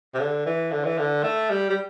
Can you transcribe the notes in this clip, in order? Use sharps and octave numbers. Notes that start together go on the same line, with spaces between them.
C3
D3
E3
D3
E3
D3
A3
G3
G3